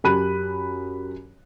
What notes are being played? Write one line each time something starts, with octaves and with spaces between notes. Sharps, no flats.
F#2 G4 B5 F#6 D#7